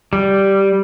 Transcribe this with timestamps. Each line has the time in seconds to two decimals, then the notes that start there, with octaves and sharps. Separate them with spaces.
0.13 G3